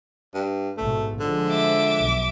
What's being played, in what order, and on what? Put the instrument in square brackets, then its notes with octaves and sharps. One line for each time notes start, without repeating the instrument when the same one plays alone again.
[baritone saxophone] G2
[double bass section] A1 G#2 B2 [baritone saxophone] A3
[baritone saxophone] D3 [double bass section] F3 G#3
[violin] E5 D6
[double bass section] B1